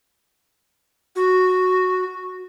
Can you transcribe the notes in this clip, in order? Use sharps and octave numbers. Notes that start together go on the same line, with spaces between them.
F#4